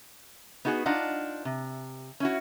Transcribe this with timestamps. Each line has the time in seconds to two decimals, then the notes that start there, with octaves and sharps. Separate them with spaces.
0.65 B3 D#4 F#4 G#4 B4
0.86 D4 D#4 F4 D#5 F#5
1.45 C3
2.20 C#4 E4 F#4